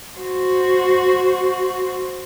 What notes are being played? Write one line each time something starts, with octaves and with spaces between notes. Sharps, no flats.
F#4 C5